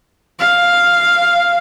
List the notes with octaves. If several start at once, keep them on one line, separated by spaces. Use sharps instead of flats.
F5